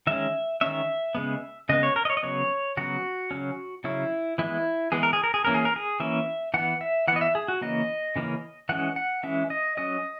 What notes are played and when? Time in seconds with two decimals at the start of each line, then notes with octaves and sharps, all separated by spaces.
0.07 D#3 G#3 C#4 E5
0.61 D#3 G#3 C#4 E5
1.15 C#3 G#3 B3
1.69 C#3 G#3 B3 D#5
1.83 C#5
1.96 A#4
2.05 D#5
2.10 C#5
2.17 D#5
2.23 C#3 F#3 B3 C#5
2.77 C#3 F#3 B3 F#4
3.31 C#3 F#3 C#4
3.84 C#3 F#3 C#4 E4
4.38 E3 G#3 B3 E4
4.92 E3 G#3 B3 G#4
5.03 A#4
5.13 G#4
5.24 A#4
5.34 G#4
5.45 E3 A#3 C#4 A#4
5.54 G#4
5.65 A#4
5.76 G#4
6.00 E3 A#3 C#4 E5
6.54 E3 B3 F#5
6.81 E5
7.08 E3 F#5
7.12 B3 D#5
7.21 E5
7.35 G#4
7.48 F#4
7.61 C#3 E3 A#3 C#4 D#5
8.16 C#3 E3 A#3 C#4
8.69 E3 G#3 C#4 F#5
8.96 F#5
9.23 E3 G#3 C#4 E5
9.50 D#5
9.77 F#3 C#4 D#5